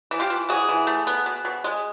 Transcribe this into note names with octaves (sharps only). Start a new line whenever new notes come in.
E3
F4 G4
E3
E3 F#4 G#4
E3
A3
B3
B2
B2
G#3